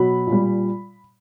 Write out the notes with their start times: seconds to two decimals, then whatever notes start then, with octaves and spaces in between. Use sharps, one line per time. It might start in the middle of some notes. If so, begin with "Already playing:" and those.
Already playing: B2 F#3 B5
0.27 A#2
0.32 G3